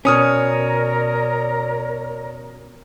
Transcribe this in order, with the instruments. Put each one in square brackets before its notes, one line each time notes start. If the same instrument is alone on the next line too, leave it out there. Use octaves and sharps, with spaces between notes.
[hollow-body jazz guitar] B2 C#4 [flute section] A#4 D5 A#5 [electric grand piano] C#5 D#6 F6